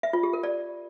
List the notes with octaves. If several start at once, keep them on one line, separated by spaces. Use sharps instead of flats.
E5
F4
G4
A#4
D5